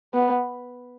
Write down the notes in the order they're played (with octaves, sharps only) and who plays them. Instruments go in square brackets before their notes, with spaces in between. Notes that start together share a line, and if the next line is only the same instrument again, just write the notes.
[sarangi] B3